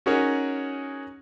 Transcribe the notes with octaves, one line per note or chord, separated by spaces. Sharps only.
C#4 D#4 F#4 G#4 A#4 C#5